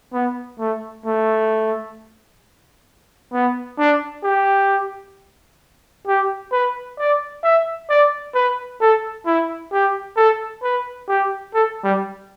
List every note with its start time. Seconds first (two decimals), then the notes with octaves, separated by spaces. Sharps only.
0.13 B3
0.59 A3
1.06 A3
3.33 B3
3.79 D4
4.24 G4
6.07 G4
6.52 B4
6.99 D5
7.43 E5
7.90 D5
8.35 B4
8.81 A4
9.26 E4
9.72 G4
10.17 A4
10.63 B4
11.09 G4
11.54 A4
11.84 G3